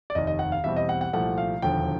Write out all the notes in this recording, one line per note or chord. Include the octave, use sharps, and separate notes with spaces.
D5
F1 D#2 D#3 D#5
D#5
F#5
F5
E2 B2 G3 C4 E5
D#5
F#5
F#5
C2 A#2 F3 A3 F#5
F5
E1 D#2 D3 F3 G5